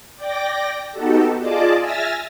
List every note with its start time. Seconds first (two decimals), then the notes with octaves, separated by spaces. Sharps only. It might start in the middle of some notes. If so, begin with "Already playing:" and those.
0.16 D5 G5 D6 A#6
0.92 B3 D#4 F#4 G4 A4
1.39 F4 G#4 D5 D#5 A5 D6
1.79 E5 G#5 E6 F6 A6 A#6